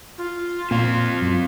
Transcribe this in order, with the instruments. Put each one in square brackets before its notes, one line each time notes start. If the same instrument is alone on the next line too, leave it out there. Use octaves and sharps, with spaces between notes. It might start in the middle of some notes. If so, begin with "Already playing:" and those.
[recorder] F4
[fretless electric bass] A#2 [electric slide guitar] C4 F5
[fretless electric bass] F#2